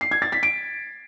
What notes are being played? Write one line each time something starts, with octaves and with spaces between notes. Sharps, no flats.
C7
G#6
A6
B6
D7